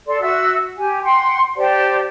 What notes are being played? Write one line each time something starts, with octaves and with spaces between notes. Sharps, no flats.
A4 D5 C6
F#4 E5 E6
G4 G#5
F#5 G5 C6
G4 C5 D5 A5